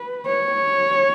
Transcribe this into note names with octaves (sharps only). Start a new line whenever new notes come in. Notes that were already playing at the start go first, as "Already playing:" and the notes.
Already playing: B4
C#5